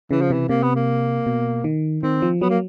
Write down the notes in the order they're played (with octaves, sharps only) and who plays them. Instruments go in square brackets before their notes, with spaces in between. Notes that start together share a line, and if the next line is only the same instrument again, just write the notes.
[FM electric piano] C#3 [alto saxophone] E3
[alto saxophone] F3
[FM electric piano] C3 [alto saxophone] E3
[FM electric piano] C3 [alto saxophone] A#3
[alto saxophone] B3
A#3
[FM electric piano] B2
D#3
[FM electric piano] D#3 [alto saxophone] C4
[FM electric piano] F3
[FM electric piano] F#3 [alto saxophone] B3
[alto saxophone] A#3